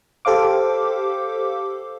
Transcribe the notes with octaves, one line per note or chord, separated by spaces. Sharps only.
G4 A4 C5 F5 D6